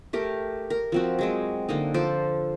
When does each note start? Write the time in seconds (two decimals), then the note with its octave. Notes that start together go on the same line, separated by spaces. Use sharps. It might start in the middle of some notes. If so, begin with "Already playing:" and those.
0.13 A3 G4 A#4
0.70 A#4
0.92 F3 C4 F#4
1.19 F#3 G#3 C4
1.69 D3 A#3 D#4
1.94 F3 A4 C5 D5